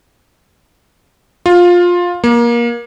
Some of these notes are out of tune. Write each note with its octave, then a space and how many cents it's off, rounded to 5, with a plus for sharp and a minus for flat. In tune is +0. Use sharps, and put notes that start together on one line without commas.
F4 +15
A#3 +25